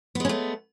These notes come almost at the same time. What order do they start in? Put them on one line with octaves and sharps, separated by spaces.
B3 G#3 C#4 A3